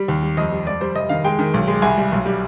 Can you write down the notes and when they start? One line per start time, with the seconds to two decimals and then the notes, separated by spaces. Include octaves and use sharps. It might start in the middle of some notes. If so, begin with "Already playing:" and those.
Already playing: G3
0.08 D#2
0.23 G3
0.37 F2 D#5
0.52 G3
0.66 F2 D5
0.81 G3 C5
0.95 F1 D#5
1.09 D#3 F5
1.25 G#3 G5
1.39 D#3
1.54 B1
1.68 G#3
1.82 C2 G#5
1.97 G3
2.12 B1
2.26 G3